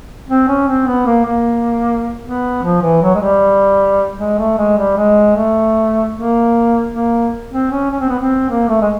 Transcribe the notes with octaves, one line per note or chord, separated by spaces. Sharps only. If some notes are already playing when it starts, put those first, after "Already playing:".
C4
C#4
C4
B3
A#3
A#3
B3
F3
E3
F#3
G#3
G3
G#3
A3
G#3
G3
G#3
A3
A#3
A#3
C4
C#4
C#4
C4
B3
C4
A#3
A3
G#3